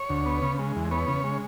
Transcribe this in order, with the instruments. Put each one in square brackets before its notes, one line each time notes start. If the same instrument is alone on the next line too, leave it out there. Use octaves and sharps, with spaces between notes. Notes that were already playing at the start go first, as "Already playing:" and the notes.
Already playing: [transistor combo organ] C#5
D2
B3
C#3
G#3
E2
B3 C#5
C#3
G#3